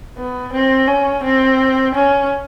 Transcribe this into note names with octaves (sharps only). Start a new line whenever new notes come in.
B3
C4
C#4
C4
C#4